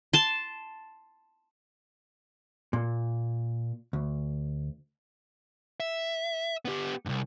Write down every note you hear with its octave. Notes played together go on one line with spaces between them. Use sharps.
A5 C6
A#2
D2
E5
B3 G4
C2 G2